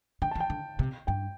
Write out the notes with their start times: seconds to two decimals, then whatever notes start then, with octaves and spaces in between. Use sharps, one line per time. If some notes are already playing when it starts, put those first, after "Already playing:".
0.22 D3 G5
0.31 A5
0.35 E3
0.40 G5
0.50 D3
0.79 C3
1.07 G2 G5